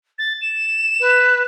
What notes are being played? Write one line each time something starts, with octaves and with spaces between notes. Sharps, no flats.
A6
E7
B4